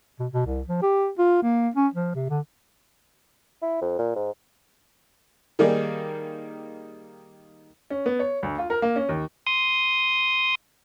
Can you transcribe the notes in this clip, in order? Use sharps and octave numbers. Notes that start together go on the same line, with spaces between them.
B2
B2
C2
F3
G4
F4
A#3
C#4
F3
C3
D3
E4
F2
A#2
G#2
D#3 G3 A#3 D#4 G#4 D5
C#4
B3
C#5
D2
F4
A#4
A#3
C#4
D#2
C6 D#6